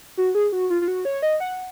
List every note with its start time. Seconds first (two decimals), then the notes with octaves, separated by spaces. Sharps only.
0.17 F#4
0.35 G#4
0.52 F#4
0.70 F4
0.82 F4
0.88 F#4
1.05 C#5
1.22 D#5
1.40 F#5